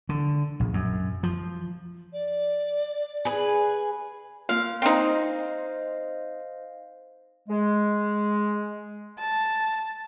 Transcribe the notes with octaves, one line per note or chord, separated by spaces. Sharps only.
D3
A#1
F#2
F3
D5
G#4 B4
A#3 F4 F5
C4 D#4 C5 D#5 F5
G#3
A5